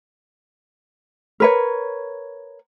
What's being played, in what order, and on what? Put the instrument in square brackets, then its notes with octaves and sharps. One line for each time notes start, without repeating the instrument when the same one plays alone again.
[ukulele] A#4 B4 C#5